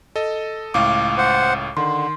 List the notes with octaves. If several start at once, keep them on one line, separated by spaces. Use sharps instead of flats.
A4 D#5
C#2 A2 F5 D6
C5 F#5
D3 D#3 C6